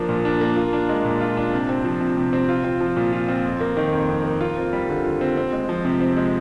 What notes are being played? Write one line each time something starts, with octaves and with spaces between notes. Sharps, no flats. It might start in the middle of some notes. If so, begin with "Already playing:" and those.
Already playing: F3 A#3 D4
A#2
D4
A#3
F4
D4
G#3
A#2
F4
D4
C3
C4
F3
C3
C3
C4
F4
C4
F3
A#2
F4
C4
F2
A#3
D#3
F2
F2
A#3
F4
C4
G3
D3
F4
C4
C4
G#3
F3
C3
C4
G#3